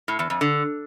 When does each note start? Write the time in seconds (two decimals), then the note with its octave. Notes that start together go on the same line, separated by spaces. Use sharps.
0.08 A2
0.19 E2
0.30 F2
0.41 D3